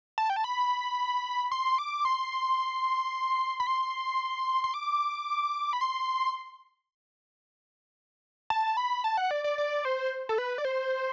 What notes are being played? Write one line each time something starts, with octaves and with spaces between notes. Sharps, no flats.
A5
G5
A5
B5
C6
D6
C6
C6
B5
C6
C6
D6
B5
C6
A5
B5
A5
F#5
D5
D5
D5
C5
A4
B4
D5
C5